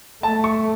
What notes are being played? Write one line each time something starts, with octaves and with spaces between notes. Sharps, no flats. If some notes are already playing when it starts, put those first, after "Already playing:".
A3 A5
C#6